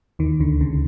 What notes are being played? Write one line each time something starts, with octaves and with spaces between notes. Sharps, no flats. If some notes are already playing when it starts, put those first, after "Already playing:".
D#2 D#3
D2 D3
C#2 C#3